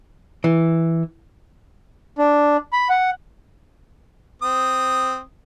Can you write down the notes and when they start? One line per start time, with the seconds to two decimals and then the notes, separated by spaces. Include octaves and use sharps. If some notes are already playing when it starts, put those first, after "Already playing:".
0.44 E3
2.18 D4
2.73 B5
2.89 F#5
4.42 C4 D#6